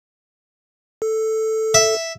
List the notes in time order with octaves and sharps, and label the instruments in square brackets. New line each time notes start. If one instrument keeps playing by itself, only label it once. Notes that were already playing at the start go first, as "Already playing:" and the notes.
[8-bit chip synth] A4
[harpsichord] E5